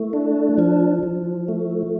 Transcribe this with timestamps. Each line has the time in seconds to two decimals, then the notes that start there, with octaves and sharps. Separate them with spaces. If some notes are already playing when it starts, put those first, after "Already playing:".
Already playing: A3 E4
0.13 D4
0.58 F3 F4
1.03 F3
1.48 A3